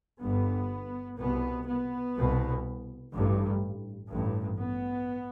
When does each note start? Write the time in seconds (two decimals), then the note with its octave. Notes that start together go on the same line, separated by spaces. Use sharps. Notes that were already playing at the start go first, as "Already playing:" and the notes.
0.20 G1 G2 B3
1.17 C2 B2 B3
1.66 B3
2.15 C2 B2
3.13 A1 G2
4.09 A1 G2
4.58 B3